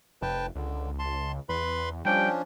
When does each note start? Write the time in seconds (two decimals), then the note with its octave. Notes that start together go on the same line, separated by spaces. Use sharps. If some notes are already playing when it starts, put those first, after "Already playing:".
0.22 F1 B4 G5 A5
0.55 C#2 D3
0.99 A5 C6
1.49 E2 B4 B5 C6
2.05 F3 G3 C#4 D4 G5